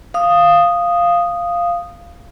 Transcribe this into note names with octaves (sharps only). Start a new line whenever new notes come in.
F5 D#6